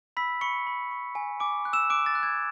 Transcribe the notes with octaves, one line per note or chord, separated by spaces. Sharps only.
B5 E6 B6
B5 C#6 C#7
B5
C#6
G#5
G#5 D6 D7
F#6
E6 E7
D6 F#6 D7
A6
F#6
G#6